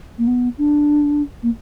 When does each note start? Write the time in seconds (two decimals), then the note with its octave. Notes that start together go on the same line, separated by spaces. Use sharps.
0.18 A#3
0.27 B3
0.58 D4
1.43 A#3